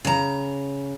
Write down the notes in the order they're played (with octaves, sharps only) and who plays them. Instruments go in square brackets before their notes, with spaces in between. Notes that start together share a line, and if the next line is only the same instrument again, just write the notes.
[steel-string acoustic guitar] C#3 A#5